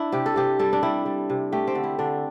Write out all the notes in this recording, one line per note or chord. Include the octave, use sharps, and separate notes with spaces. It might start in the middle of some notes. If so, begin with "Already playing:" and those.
Already playing: D4 E4
C3 G4
A4
C3 G4
G3 A4
D4
G3 E4
G3
C3
A3 G4
C4
D3
E4
D3 D4